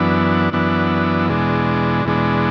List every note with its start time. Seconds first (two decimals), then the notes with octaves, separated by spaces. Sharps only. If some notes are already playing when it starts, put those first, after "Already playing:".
Already playing: F#2 E3 B3 D4
0.53 F#2 E3 B3 D4
1.29 E2 B2 G#3 D4
2.05 E2 B2 G#3 D4